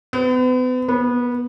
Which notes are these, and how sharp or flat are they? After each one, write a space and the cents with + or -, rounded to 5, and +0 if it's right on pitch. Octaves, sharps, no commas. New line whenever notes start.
B3 +40
B3 -20